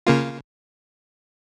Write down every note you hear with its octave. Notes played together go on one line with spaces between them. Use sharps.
C#3 A#3 F4